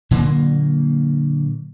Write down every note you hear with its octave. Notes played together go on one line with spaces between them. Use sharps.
A#2 D3 F#3 A#3